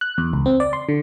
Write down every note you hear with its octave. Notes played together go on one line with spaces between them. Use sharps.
F#6
E2
C#2
C4
D5
C6
D3